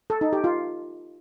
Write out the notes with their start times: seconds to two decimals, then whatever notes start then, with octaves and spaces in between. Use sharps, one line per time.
0.10 A4
0.21 D#4
0.33 G4
0.44 F4